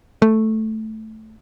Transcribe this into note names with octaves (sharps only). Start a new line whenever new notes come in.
A3